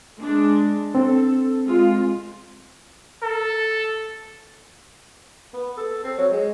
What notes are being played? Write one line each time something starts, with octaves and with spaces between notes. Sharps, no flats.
G#3 D4
C4 A4
G#3 F4
A4
B3
A4
C4
F#3
G#3